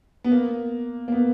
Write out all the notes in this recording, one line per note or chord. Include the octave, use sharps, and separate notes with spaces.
B3
A#3
A#3
B3